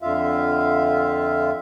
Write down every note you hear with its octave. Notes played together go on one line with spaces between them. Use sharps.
F2 D3 F4 E5 F5